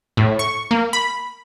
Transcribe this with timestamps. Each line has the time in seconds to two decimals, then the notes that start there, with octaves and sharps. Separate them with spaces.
0.17 A2
0.39 C#6
0.71 A#3
0.93 B5